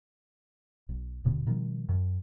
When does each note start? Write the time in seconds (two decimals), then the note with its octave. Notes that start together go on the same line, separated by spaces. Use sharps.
0.89 B1
1.24 D#1 B2 D3
1.46 B2 D#3 F3 G3
1.89 F#2